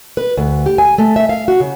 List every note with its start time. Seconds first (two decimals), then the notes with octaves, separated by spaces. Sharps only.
0.17 B4
0.37 D2
0.66 G4
0.78 G#5
0.98 A3
1.16 E5
1.29 F5
1.48 F#4
1.60 C#3